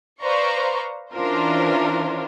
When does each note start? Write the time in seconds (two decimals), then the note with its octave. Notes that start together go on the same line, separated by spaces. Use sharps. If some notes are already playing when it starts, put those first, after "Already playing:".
0.22 B4 C5 D5 F5 A#5 C#6
1.12 E3 C#4 D4 F4 A#4 C5